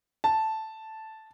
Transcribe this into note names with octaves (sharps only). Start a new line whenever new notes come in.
A5